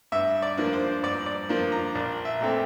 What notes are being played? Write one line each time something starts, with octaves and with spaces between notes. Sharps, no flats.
G2 E5
D5
F3 A#3 D4
C5
G2 D5
D5
F3 A#3 D4
A#5
A#1 D5
E5
A#2 A3 C4